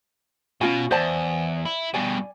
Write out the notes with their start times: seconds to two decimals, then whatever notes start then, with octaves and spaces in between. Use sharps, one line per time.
0.61 B2 C#4 F4 G#5
0.91 E2 C5 D5 A5
1.66 E4
1.94 G2 B2 D5 G#5